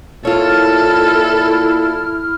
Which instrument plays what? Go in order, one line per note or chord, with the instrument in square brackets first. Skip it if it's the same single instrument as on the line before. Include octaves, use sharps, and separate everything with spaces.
[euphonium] A#2 [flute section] E4 F6 [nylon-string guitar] F4 C#5 [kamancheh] A4